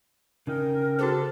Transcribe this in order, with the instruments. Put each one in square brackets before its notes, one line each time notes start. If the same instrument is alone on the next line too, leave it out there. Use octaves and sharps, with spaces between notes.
[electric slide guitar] C#3 D#4 G5 [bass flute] A#4
[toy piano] F#4 G#4 C5 [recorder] A4